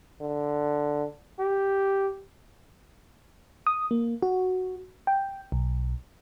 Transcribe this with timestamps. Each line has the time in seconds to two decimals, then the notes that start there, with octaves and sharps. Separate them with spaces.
0.21 D3
1.39 G4
3.67 D#6
3.91 A#3
4.22 F#4
5.07 G5
5.52 B1